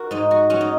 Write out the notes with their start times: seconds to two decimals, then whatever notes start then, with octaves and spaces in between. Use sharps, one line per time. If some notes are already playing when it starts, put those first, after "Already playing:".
Already playing: F#4 A#4
0.11 G#2 D#4
0.31 F#4
0.50 C#4 F#4
0.61 D#4